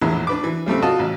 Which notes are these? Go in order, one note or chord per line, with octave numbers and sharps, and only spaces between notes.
A#1 E2 A2 E4
D4 B4 D6
E3
C#3 G3 A3 C4
F4 F#4 D#5 A5
A1